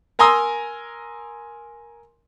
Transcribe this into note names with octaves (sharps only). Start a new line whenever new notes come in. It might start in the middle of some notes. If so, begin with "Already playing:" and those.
A#4 G#5 A#5 C6 D#6 E6